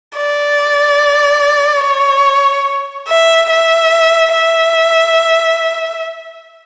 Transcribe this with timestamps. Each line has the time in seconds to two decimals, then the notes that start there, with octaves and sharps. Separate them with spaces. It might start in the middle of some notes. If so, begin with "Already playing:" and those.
0.17 D5
1.83 C#5
3.08 E5
3.50 E5
4.33 E5